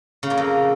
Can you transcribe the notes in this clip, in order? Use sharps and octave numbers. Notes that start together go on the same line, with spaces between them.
C#3
A#2
F2